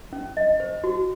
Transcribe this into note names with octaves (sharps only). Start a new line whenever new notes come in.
C#4
D#5
C5
F#4